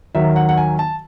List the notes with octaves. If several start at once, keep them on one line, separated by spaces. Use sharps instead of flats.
D#2 D#3 F#3 E5
F#5
F#5
G#5
A5